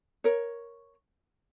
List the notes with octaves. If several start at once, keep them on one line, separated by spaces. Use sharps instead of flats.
A#4 C#5